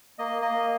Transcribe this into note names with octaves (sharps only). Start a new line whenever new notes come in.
A#3 D#5
A#3 D#5